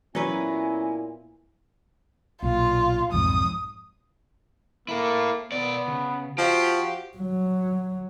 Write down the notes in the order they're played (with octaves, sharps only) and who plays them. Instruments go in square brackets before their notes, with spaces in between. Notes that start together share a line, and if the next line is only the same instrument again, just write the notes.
[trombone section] A#2 B3 E4 [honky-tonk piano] F#3 [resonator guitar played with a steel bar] C#4 B4 [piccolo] G#5
[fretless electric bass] B1 A#2 [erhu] F4
[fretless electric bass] B1 F2 G#2 [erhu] D#6
[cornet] A#3 [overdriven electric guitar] E4 A4
[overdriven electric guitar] B2 D5 [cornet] B3
[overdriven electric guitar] C#3
[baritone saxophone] F3 [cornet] F#4 [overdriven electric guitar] G4
[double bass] F#3